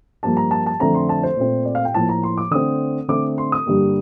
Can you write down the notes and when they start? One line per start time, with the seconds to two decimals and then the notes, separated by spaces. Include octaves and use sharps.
0.23 G2 F3 A#3 A5
0.37 A#5
0.51 A5
0.66 A5
0.80 F2 D3 A3 C4 A#5
0.94 C6
1.09 A5
1.23 C5
1.37 A#2 A3 C4
1.65 D5
1.75 F5
1.85 G5
1.94 A2 F3 A#3 A5
2.09 A#5
2.23 C6
2.38 D6
2.51 D3 A3 C4 D#6
3.08 D3 A3 C4 D6
3.38 C6
3.52 D#6
3.66 G2 D3 G3 A#3